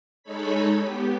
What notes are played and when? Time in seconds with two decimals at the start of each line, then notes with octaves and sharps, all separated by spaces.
0.23 G#3 D#4 A4 C#5 B5 B6
0.82 B3 G4